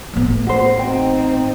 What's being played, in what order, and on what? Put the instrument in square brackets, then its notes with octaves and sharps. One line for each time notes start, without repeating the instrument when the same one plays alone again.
[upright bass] A1 B3
[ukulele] F#4 C5
[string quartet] C4 D#4 [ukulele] G5